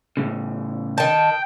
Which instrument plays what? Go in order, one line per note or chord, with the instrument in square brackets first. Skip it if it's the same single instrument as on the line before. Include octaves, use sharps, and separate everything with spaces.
[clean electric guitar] A2 C#3
[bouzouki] D#3 A5 [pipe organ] G5